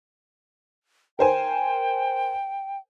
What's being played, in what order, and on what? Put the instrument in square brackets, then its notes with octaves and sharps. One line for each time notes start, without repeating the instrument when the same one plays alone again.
[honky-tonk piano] A#4 C5 G#5 [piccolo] G5